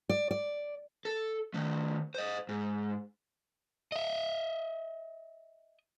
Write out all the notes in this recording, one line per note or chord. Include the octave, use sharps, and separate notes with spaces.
D5
D5
A4
D#3 A3
C5 D#5
G#2
D#5 E5